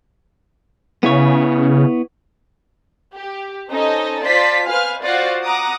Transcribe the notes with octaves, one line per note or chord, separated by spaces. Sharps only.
C#3 B3 E4 C#5
G4
C#4 D#4 A4 C5 D#5
F4 C5 D5 A5 C6 B6
B4 C5 F5 G#5 F6
F4 F#4 C5 D5 F5 F#5
F#5 A#5 D6 D#6